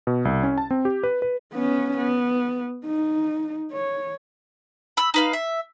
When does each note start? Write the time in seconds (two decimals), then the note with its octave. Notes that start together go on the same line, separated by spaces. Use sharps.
0.07 B2
0.25 C2
0.43 C#4
0.58 A5
0.71 C4
0.85 G4
1.03 B4
1.22 B4
1.54 B3 C#4
1.97 B3
2.85 D#4
3.72 C#5
4.97 B5 E6
5.14 D#4 B4 F5
5.33 E5